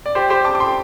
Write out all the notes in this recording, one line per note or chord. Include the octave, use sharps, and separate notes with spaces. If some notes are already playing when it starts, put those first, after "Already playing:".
D5
G4 C5
G4 C5
A5 D6
D6
G5 C6